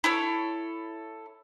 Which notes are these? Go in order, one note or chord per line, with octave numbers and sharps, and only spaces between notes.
E4 A4 C#5